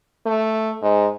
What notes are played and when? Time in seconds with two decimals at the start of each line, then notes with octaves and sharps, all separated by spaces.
0.26 A3
0.82 G#2